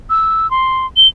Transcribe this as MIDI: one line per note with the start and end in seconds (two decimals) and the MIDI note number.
0.10 0.50 88
0.51 0.86 84
0.97 1.08 103